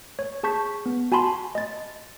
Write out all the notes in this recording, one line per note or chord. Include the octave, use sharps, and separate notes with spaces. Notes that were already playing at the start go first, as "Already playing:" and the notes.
C#5
G#4 A5 C#6 G6 B6
B3
F#4 G#5 A5 B5 C6
D#5 A6